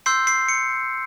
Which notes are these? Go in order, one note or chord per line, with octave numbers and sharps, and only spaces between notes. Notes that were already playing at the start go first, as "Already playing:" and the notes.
C6 E6 G6 C7
C7
C#7